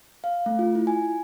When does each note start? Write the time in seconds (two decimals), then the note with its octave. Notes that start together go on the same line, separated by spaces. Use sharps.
0.24 F5
0.46 A3
0.59 F4
0.75 E4
0.87 G#5